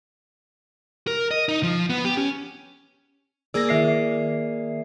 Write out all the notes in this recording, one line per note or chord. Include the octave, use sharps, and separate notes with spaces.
A#4
D#5
D#4
F3
B3
G4
C#4
A#3 G#4 D5 E6 A#6
D#3 E5 C7